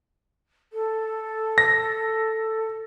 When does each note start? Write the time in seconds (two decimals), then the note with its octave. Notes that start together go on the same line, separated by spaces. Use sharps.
0.73 A4
1.58 A#6